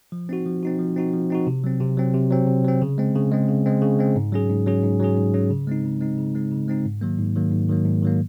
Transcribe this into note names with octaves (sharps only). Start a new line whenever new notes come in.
F3
C4 D#4 F#4
F3
C4 D#4 F#4
F3
C4 D#4 F#4
F3
C4 D#4 F#4
C3
F#3 C4
C3
F#3 C4
C3
F#3 C4
C3
F#3 C4
C#3
G#3 C4
C#3
G#3 C4
C#3
G#3 C4
C#3
G#3 C4
G#2
F#3 C#4 G#4
G#2
F#3 C#4 G#4
G#2
F#3 C#4 G#4
G#2
F#3 C#4 G#4
C#3
G#3 C4 D#4
C#3
G#3 C4 D#4
C#3
G#3 C4 D#4
C#3
G#3 C4 D#4
G#2
D#3 F#3 A#3
G#2
D#3 F#3 A#3
G#2
D#3 F#3 A#3
G#2
D#3 F#3 A#3